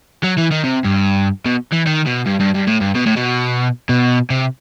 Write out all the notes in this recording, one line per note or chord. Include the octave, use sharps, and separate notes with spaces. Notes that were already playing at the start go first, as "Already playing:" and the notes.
F#3
E3
D#3
C3
G2
B2
E3
D#3
B2
G2
G2
G2
A2
G2
B2
A2
B2
B2
C3